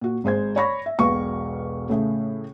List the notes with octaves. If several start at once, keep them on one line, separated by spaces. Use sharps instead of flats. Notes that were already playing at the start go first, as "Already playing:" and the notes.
A#2 F#4
G#1 G#3 C5 G#6
C#5 D5 B5 C#6 A#6
E5
E1 B1 B4 F5 C#6
A2 C#3 A3 G#4